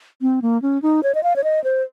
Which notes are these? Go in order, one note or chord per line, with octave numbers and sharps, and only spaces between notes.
C4
A#3
C#4
D#4
C#5
D#5
F5
C#5
D#5
C5